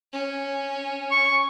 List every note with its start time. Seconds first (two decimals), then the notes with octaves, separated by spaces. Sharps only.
0.13 C#4
1.11 C#6